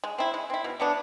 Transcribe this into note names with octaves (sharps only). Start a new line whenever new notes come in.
G#3
C4 E4
G#3
C4 E4
B2
F#3 B3 D4